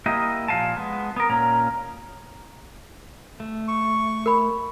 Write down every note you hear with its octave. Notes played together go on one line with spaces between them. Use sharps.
A#3 E4 G4 D#5
A#2 F3 F5 G#5 A5
G#3 B3
B3 A#4
A#2 A#3 C#4 A#5
A3
C#6
A#4 B5